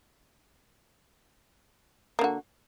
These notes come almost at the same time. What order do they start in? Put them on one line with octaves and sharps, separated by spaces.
A#3 D3 F#4